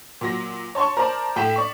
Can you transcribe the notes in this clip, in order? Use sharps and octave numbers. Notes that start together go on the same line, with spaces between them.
A#2 F#3 A#6
C#5 A5 C6 C#6
A#4 C5 D5 A5
A2 G5 B6 E7
D5 C#6